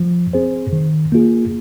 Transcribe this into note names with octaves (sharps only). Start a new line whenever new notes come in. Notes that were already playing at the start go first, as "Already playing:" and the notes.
Already playing: F3
C4 G#4 C5
D#3
A#3 F4 G#4